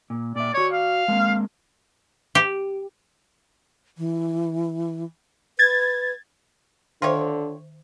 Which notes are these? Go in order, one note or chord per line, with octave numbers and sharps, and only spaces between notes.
A#2
A#2 D5 E5
F#4 C#5 D5
F5
G#3 A#3 C4
G4
E3
B4 G#6 A6
D3 D#3 F4 G4 C5 C#5 E5